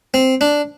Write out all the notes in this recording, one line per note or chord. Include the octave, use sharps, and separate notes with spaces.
C4
D4